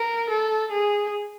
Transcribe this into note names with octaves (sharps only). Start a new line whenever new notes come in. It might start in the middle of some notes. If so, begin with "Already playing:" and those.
Already playing: A#4
A4
G#4